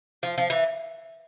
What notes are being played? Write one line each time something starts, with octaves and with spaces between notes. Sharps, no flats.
F3
F3
E3